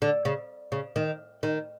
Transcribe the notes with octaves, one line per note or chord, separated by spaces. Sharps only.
D3
C#3
C#3
D#3
D#3